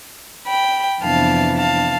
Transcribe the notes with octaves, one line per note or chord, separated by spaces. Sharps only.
G5 B5
F2 C3 E3 B3 D4 F5 A5
F5 A5